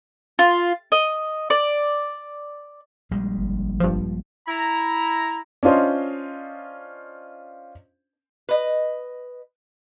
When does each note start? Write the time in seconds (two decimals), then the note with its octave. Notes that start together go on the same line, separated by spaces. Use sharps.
0.39 F4
0.92 D#5
1.50 D5
3.11 A#1 G3 G#3
3.37 G1
3.80 G2 F3
4.48 E4 A#5
5.63 C#4 D4 F4 C5 D#5
8.49 B4 D#5